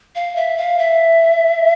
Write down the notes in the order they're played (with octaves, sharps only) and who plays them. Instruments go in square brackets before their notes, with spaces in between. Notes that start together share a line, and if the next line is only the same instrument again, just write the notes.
[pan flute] F5
E5
F5
E5